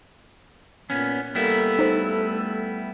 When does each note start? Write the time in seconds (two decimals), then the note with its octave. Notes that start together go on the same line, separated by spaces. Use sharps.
0.90 A#2 B3 C#4
1.35 G3 A#3 B3 E4 A4
1.79 A3 D#4 C5